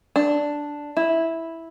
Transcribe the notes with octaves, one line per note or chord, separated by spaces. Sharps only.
D4
E4